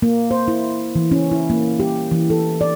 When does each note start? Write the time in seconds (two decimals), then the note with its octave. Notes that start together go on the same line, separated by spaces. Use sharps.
0.02 A#3
0.31 C5
0.48 E4
0.95 E3
1.11 C#4
1.31 E4
1.50 A#3
1.80 G4
2.11 E3
2.30 A4
2.61 D5